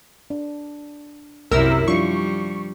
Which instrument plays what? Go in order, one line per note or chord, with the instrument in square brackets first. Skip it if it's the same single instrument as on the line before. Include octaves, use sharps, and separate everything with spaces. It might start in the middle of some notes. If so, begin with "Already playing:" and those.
[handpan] D4
[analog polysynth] C2 A#4 E6 [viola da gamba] F#2 C3 E4
[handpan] F3 D4 F4 [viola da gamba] G3 [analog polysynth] C#6